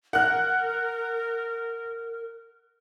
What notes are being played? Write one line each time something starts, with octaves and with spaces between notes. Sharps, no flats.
A#4 F#5 F#6